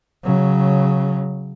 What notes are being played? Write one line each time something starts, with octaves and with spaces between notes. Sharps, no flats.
C#3 F#3